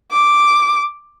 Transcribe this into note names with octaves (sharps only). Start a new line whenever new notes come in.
D6